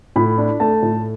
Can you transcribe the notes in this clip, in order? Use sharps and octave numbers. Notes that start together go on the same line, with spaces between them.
A2 B5
D4
A3 A5
A2